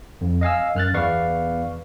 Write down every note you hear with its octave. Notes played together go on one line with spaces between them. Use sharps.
F2
D#5 F5 G#5 E6
F#2 F6 F#6 A6
E2 B3 B4 D5 F5 C#6